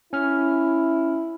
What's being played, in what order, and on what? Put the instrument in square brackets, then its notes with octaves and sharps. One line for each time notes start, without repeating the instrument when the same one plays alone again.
[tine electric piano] C#4 F6 [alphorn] E4